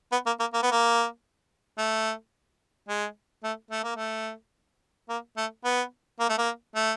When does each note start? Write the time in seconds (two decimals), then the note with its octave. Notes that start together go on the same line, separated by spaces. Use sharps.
0.12 B3
0.26 A#3
0.40 A#3
0.54 A#3
0.63 B3
0.72 A#3
1.78 A3
2.88 G#3
3.43 A3
3.71 A3
3.84 A#3
3.96 A3
5.09 A#3
5.37 A3
5.65 B3
6.19 A#3
6.29 A3
6.38 A#3
6.75 A3